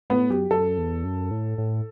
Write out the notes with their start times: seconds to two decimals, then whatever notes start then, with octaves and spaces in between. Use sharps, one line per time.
0.10 A2 B3
0.30 F#2 G4
0.50 F#2 A4
0.78 E2
1.04 F#2
1.31 A2
1.58 A2